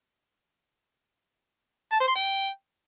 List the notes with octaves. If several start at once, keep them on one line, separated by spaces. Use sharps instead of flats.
A5
C5
C6
G5